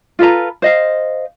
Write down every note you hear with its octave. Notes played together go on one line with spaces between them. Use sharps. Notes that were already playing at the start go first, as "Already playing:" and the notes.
F4 A4 B4 A#5
C5 D#5 F5